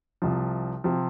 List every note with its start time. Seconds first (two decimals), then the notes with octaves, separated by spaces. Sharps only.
0.22 C2 C3 F3
0.84 C3 F3